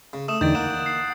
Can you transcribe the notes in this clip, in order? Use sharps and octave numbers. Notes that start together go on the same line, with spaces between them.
C#3
A3 D#6 E7
E2 D3 D#3 D#4 G6 A6 D7
A#3 F#5 E7
C7